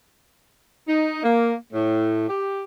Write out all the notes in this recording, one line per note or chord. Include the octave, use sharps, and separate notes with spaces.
D#4
A#3
A2
G4